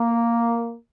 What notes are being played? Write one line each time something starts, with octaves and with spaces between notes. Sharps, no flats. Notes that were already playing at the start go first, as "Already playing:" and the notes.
Already playing: A#3